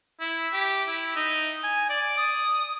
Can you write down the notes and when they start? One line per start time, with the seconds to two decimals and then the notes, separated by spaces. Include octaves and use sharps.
0.20 E4
0.53 G4
0.88 E4
1.16 D#4
1.64 G#5
1.90 D5
2.18 D#6